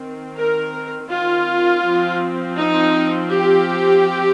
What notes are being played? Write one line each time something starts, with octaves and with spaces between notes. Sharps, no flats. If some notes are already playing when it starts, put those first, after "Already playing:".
Already playing: D#3 C4
A#4
F4
F3 C4
D#4
G4